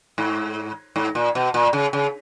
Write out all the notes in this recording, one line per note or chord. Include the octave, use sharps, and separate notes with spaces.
G#2
G#2
A#2
B2
A#2
C#3
C#3